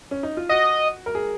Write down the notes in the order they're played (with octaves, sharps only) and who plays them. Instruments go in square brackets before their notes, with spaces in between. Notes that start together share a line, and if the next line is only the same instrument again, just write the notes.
[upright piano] C#4
D#4
F4
[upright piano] F#4 [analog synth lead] D#5
[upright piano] A#4
G#4